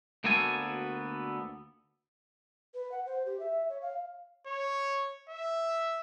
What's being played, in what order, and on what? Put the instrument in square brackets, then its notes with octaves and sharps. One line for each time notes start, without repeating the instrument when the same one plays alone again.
[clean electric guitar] D2 A#3 B3 F#4 A4 G#5
[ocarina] B4
F#5
C5
G4
E5
C#5
F5
[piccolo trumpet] C#5
E5